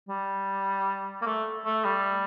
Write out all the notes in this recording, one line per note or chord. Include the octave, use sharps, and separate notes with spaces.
G3
A#3
A3
A3
G3